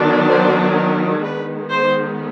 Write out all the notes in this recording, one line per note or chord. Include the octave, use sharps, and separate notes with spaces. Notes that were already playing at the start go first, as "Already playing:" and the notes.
Already playing: D#3 F#3 B3 D4
C5
A#4
D#3 G#3 B3 B4
C5